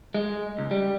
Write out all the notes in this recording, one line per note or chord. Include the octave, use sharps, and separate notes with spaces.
G#3
C#2
G3